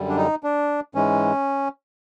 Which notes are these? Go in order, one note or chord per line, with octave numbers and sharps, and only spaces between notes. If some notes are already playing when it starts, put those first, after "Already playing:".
Already playing: F#2 D3 G3
D4
D#4
D4
G#2 E3 G#3 C#4